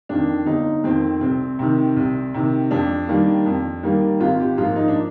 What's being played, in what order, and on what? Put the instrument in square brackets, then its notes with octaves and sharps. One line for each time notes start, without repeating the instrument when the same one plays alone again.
[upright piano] F2 D#3 D4
G1 D#4
F2 D#3 C4
C2 C4
C3 D#3
C2
C3 D#3
F2 D4
D#3 G3 A#3
F2
D#3 G3 A#3
G#1 F4
G4
G#2 F3 A#3 F4
D#4
D4